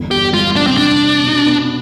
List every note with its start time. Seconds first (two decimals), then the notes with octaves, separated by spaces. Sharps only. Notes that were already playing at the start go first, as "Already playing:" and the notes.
Already playing: G1 E2
0.11 G1 G4
0.34 G3 F4
0.56 C3 D4
0.67 C4
0.77 C3 D4
1.01 C3
1.23 B2
1.46 B3